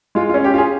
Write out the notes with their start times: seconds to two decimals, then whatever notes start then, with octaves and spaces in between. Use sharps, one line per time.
0.15 G#3 F4
0.29 F4
0.34 C#4
0.44 G4
0.54 F4 G#4